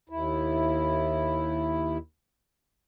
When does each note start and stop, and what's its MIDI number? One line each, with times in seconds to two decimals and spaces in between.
0.09 1.97 39
0.09 1.97 64